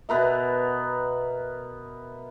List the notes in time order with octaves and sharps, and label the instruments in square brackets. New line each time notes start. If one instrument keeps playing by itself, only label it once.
[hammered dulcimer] B2 B3 A#4 E5